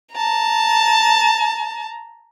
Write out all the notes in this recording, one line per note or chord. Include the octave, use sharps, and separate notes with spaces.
A5 A#5